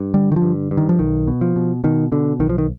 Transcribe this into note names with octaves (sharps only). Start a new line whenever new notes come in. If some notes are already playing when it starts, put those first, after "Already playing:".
Already playing: G2
D3 G3
D#3
F3
G2
G2
D#3
F3
B1 D#3
B2
F3
B2
B2 D#3
B2 D3
B1 D#3
F3
D#3